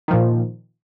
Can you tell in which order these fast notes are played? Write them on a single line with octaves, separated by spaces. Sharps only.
D#3 F3 A#2